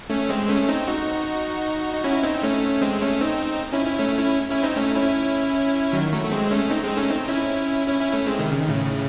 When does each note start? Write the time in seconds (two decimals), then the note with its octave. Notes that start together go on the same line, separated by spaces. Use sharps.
0.10 A3 C#4
0.29 G#3 C4
0.48 A3 C#4
0.69 C4 D#4
0.87 D#4 F#4
1.94 D#4
2.04 C#4 E4
2.23 C4 D#4
2.43 A3 C#4
2.82 G#3 C4
3.01 A3 C#4
3.21 C4 D#4
3.73 C#4 E4
3.85 C#4 E4
3.99 A3 C#4
4.18 C#4 E4
4.50 C#4 E4
4.63 C4 D#4
4.76 A3 C#4
4.95 C#4 E4
5.93 D#3 F#3
6.13 F#3 A3
6.25 A3
6.31 G#3 C4
6.51 A3 C#4
6.70 C4 D#4
6.84 G#3 C4
6.97 A3 C#4
7.10 C4 D#4
7.29 C#4 E4
7.87 C#4 E4
8.01 C#4 E4
8.13 A3 C#4
8.26 G#3 C4
8.39 C3 D#3
8.52 C#3
8.61 D#3
8.69 A2 C#3